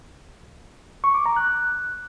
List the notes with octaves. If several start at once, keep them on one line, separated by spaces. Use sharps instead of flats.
C#6
D6
A#5
F#6